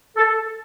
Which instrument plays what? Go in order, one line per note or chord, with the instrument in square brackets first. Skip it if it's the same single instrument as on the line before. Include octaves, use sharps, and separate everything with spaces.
[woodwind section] A4